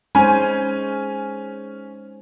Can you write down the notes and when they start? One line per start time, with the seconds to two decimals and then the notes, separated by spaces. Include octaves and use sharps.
0.15 G#3 C#4 D#4 C5 G#5